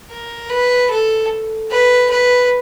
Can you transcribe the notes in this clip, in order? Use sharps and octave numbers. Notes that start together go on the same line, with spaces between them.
A#4
B4
A4
B4
B4